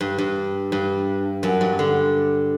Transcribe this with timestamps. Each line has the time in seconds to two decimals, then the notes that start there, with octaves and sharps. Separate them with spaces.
0.01 G2
0.18 G2
0.72 G2
1.43 F#2
1.61 G2
1.79 D3